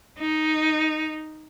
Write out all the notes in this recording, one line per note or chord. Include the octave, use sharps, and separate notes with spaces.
D#4